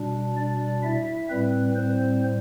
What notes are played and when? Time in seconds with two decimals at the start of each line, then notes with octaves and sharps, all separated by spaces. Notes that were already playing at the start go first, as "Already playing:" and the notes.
Already playing: B2 G3 D4
0.37 D4 D5
0.83 E4 E5
1.29 A2 G3 C4 B4
1.75 C4 C5